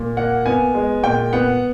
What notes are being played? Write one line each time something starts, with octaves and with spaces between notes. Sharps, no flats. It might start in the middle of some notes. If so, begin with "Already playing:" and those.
Already playing: A#2
A#3 F#5
B3 G#5
G#3
A#2 G5
B3 F#5